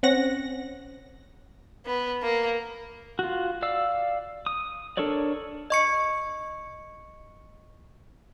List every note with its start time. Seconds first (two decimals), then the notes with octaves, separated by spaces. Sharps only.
0.03 C4 C#4 F#5 A#6
1.86 B3
2.22 A#3
3.19 F4 F#4
3.62 D5 F5 E6
4.46 D#6
4.97 D4 A4 A#4 C#5 D5
5.70 D#5 C#6 C#7